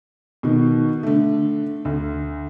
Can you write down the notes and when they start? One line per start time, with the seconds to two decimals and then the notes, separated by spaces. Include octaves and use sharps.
0.43 B2 D#3
1.03 D3 A3
1.85 D2